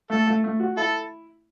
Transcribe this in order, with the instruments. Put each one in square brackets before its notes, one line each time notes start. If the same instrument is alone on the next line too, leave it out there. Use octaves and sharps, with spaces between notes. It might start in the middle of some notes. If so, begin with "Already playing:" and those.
[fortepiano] A3 [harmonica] A4
[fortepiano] A3
A3
F#4
[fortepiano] E4 [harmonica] A4